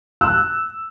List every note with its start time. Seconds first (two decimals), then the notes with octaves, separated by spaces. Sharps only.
0.21 E6 F#6